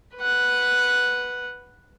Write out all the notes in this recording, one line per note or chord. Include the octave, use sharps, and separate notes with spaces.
B4 F#5